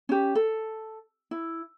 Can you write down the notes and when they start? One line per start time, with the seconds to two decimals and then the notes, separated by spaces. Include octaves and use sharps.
0.09 C#4 G4
0.35 A4
1.31 E4